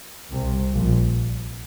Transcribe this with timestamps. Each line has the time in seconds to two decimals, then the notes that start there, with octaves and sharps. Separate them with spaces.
0.32 C2 C3
0.73 A#1 A#2